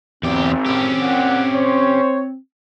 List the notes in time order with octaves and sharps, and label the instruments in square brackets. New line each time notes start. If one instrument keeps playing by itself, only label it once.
[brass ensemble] G#1 [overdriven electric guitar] E2 G4 [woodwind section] C4
[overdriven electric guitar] C#4 G4
[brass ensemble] A#2 F#5
C5 C#5